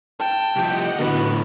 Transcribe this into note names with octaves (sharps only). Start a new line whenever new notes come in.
G5 A5
C2 F3 G4 D#5 F#5
A2 D3 E3 B3 F#4